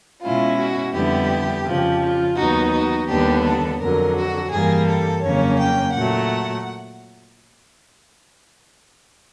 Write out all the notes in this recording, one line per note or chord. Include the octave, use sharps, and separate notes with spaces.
B2 G#3 C#4 E4 F4
F#4
F2 D3 G3 B3 E4 G4
F2 C#3 F3
F4
D#2 D#3 F#3 B3 D#4 F#4
F#4
D#2 D3 G3 B3 D4 G4
A4
F2 D3 F#3 A#4
F#4
G2 E3 G3 A#3 G#4
A4
F2 C#3 F#3 A#3 C#4 C#5
G5
A#2 F#3 A3 F#5